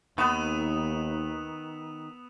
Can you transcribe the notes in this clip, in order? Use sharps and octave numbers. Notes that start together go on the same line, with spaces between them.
D#2 D#3 B3 B4 D#6 E6 E7